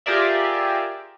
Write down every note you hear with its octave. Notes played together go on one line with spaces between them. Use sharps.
F4 G4 G#4 A#4 D5 E5